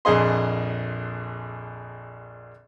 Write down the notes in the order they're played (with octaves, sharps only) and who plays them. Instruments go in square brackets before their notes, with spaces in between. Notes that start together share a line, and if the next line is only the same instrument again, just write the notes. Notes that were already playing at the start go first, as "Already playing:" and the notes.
[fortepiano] A#1 F2 G#4 D#5 C6